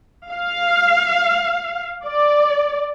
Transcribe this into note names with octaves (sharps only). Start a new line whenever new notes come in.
F5
D5